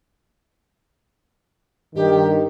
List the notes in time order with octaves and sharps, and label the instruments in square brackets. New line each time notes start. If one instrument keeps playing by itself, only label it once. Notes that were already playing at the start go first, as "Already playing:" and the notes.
[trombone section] G2 D#3 [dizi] G4